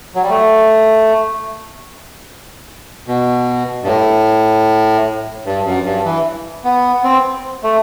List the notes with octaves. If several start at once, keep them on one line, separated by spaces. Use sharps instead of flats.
F#3
G3
A3
B2
G2
A2
G2
F#2
G2
E3
B3
C4
A3